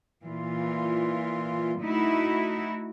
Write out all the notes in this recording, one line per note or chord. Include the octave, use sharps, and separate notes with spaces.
A#2 E3 F4
A3 D#4 E4 F#4